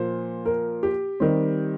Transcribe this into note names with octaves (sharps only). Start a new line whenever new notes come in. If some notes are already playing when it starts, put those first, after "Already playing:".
Already playing: A#2 F3 A#3 C5
A#4
G4
D#3 G3 C4